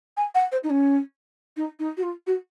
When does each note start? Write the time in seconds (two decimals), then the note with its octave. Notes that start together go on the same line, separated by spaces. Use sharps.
0.17 G#5
0.35 F#5
0.52 C5
0.64 D#4
0.70 C#4
1.57 D#4
1.79 D#4
1.97 F#4
2.03 F4
2.27 F#4